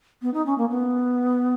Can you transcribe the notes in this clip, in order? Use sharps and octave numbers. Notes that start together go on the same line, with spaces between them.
B3
D#4
C#4
A#3
B3